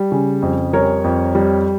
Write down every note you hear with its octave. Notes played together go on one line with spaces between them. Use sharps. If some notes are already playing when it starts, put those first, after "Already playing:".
Already playing: G3
C#3
F2
G3 A#4 C#5
F2
G3